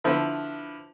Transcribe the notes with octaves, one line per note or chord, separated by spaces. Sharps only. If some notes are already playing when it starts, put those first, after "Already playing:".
D3 F3 E4 B4